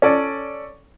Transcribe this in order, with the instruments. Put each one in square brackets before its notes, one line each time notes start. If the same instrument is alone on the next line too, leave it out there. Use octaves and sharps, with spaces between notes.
[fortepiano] C#4 A4 D5